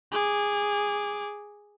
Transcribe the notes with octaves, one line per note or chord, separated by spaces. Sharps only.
G#4 D6